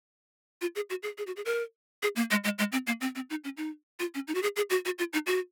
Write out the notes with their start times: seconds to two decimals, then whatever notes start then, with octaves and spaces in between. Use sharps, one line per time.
0.61 F4
0.76 G#4
0.90 F#4
1.03 G#4
1.18 G#4
1.27 F#4
1.36 G#4
1.45 A#4
2.03 G#4
2.16 A#3
2.31 G#3
2.44 G#3
2.59 G#3
2.72 C4
2.87 A#3
3.01 C4
3.15 C4
3.30 D#4
3.44 C#4
3.57 D#4
4.00 F4
4.15 C#4
4.28 D#4
4.35 F#4
4.43 G#4
4.56 G#4
4.70 F#4
4.85 F#4
4.99 F4
5.13 D#4
5.27 F#4